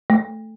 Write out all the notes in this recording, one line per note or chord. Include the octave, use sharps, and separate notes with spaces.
A3